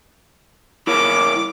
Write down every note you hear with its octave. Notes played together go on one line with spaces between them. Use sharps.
E4 A#4 C#5 D6